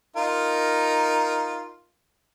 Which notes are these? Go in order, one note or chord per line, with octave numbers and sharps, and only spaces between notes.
D#4 F4 A#4